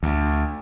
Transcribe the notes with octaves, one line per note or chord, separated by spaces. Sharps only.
D2